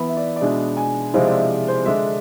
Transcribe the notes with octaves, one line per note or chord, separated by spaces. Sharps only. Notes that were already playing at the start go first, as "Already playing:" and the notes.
Already playing: E3 B3 E4 B5
E5
D5
D5
B2 G#3 D4 E5
G#5
C3 F3 G#3 C4 E4 F5
D5
E5
C5
D3 G#3 D4 E5